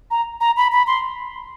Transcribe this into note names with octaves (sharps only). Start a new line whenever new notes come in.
A#5
A#5
B5
B5
C6